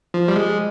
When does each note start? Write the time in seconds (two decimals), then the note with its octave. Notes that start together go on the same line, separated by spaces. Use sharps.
0.14 F3
0.28 G3
0.36 G#3